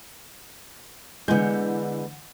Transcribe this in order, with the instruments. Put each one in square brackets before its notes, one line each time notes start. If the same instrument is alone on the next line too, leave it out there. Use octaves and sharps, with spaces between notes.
[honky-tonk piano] D3 E3 G6 [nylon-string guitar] G#3 B3